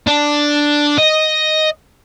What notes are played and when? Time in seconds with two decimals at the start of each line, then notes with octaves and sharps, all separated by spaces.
0.07 D4
0.99 D#5